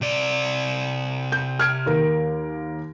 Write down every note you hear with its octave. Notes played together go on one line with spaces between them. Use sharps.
C3 D5
G6
F6 G#6 D7
D#2 A#4